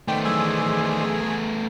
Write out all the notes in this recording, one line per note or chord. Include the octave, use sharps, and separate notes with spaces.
D#3 A3 B3 C5 D5 G5
E3 F#3 G#4 E6